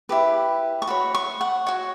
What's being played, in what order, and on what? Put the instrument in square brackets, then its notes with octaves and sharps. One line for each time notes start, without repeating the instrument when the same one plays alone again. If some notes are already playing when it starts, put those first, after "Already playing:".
[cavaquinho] E4 G4 B4
C#6
F#4 C#5 B5
C#6
F#5
F#4 C#5